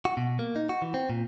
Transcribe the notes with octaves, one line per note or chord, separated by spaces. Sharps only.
F#4
B2
A#3
D#4
F#4
E3
C4
A#2